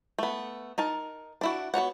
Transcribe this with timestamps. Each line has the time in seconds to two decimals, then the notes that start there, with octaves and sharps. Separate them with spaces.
0.18 A3 B3
0.78 D#4 A#4 A5
1.41 D4 E4 F#4
1.74 B3 F#4 C#5 F#5